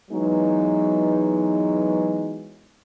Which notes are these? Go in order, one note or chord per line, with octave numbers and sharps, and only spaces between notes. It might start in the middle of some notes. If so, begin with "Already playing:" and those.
E3 F#3 G#3 B3 D#4